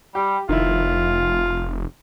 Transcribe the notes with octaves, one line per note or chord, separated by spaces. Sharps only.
G3 G4
F1 D#3 E4 F4